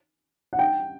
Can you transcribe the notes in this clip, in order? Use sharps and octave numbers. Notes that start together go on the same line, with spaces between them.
F#5
G5